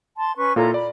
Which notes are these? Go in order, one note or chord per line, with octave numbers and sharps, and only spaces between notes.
A5 C6
C#4 B4 C#6
A#2 E4 F4 A4 C#5 A#5
D5 B5